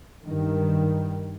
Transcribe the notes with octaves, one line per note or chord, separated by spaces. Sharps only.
G2 D#3